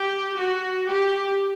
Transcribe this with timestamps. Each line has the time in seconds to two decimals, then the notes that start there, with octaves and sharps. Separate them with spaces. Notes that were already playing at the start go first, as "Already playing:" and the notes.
Already playing: G4
0.37 F#4
0.88 G4